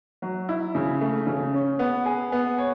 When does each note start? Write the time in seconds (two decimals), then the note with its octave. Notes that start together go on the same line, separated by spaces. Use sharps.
0.22 F#3
0.49 E4
0.75 C#3
1.01 A3
1.27 C#3
1.54 C#4
1.79 B3
2.06 G#4
2.32 B3
2.58 C#5